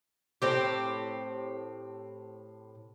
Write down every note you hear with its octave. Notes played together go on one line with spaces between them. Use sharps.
A2 C4 G4